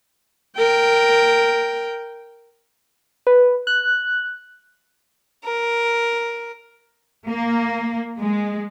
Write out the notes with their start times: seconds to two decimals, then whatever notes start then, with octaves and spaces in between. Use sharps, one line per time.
0.57 A#4 G5
3.27 B4
3.67 F#6
5.43 A#4
7.28 A#3
8.20 G#3